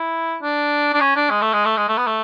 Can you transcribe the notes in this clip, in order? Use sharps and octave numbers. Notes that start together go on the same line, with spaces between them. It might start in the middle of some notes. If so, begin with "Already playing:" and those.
Already playing: E4
D4
D4
C#4
D4
G#3
A3
G#3
A3
G#3
A3
B3
A3